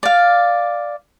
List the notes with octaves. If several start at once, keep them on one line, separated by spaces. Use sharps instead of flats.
D5 F5